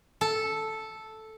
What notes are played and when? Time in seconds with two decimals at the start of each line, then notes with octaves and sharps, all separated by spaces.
0.21 A4